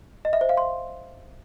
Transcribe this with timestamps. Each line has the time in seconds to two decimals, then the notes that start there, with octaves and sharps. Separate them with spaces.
0.25 D#5
0.33 E5
0.41 C5
0.49 F5
0.57 C6